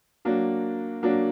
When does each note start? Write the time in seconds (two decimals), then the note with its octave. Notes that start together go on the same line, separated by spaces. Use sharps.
0.25 F#3 A#3 D4 F#4
1.03 F#3 A#3 D4 F#4